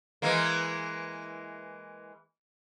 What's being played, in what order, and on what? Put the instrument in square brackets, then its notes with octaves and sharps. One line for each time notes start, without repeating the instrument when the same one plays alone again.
[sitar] E3 G#3 A#3